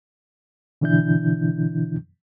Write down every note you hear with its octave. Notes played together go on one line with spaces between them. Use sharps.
B2 D3 E3 D4 E4 G6